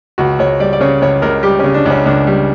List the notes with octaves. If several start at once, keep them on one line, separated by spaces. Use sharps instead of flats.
C#2 F#4
C#2 C#5
G3 D5
D5
C#3 C#5
C#2 C#5
C#2 A#4
G3 G4
C#3 C#4
D4
C#2 C#4
C#2 D4
G3